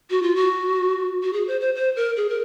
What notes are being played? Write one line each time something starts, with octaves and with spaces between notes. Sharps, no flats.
F#4
F4
F#4
F#4
G#4
C5
C5
C5
A#4
G#4
A#4